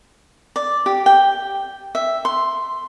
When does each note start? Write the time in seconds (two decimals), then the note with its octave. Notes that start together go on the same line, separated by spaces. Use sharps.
0.56 D5
0.86 G4
1.06 G5
1.95 E5
2.25 C6